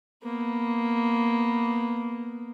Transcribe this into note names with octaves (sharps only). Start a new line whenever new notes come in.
A#3 B3